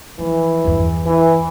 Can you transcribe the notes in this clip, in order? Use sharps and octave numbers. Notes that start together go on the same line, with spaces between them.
E3 F3
G1 E2
E3